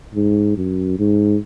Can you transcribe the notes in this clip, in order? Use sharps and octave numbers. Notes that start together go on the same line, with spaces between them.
G#2
F#2
G#2